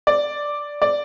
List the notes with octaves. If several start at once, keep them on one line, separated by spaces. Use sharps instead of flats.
D5
D5